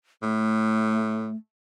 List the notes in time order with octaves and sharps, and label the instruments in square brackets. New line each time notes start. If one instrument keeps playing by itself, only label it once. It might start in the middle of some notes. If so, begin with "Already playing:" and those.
[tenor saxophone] A2 [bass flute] A3